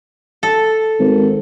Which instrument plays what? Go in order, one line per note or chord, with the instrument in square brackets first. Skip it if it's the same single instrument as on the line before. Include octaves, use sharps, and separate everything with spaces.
[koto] A4
[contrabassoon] G#1